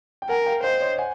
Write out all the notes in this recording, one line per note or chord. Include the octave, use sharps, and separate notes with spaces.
G5
A#4 F#5 G#5
F5 G5
C5 D#5 F5
C#5 D#5
F#5 G#5